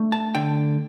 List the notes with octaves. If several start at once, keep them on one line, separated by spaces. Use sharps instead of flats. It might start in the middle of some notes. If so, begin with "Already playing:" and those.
Already playing: A3 D4
A5
D3 G5